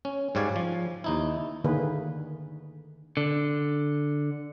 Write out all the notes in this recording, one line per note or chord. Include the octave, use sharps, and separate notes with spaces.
C#4
G#2 G3 C#5 D5 F5 G#5
F3
D#2 D#4 E4
D3 D#3 A#3 G#4 B4
D3